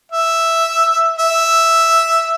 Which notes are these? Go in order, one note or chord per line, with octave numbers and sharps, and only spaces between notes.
E5
E5